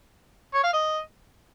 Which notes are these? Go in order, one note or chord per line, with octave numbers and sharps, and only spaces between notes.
C#5
F5
D#5